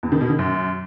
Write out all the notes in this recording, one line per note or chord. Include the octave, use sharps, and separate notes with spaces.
E2
D#3
B2
D#3
F#2